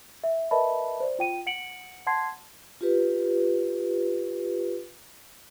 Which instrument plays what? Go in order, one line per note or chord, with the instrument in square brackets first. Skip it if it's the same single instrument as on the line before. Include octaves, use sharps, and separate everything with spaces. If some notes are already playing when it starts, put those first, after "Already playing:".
[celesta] E5
A#4 B4 D#5 E5 A5 B5
C5 D5
F4 G5 D#7
F#5 C#7 D7 F#7
F#5 A5 C6 G#6 C7
[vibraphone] F4 G4 B4